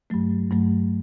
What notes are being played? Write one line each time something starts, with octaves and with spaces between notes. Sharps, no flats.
G2 F#3 A3
G2 F#3 A3